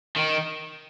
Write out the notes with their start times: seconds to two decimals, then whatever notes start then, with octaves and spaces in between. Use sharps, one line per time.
0.16 D#3